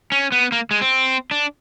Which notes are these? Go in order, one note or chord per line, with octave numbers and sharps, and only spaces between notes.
C#4
B3
A#3
G#3
C4
D4